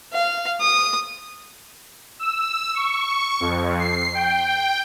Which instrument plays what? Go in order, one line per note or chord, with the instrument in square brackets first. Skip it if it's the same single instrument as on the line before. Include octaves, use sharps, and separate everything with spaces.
[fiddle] F5
D#6
[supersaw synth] E6
C#6
F2
C7
G5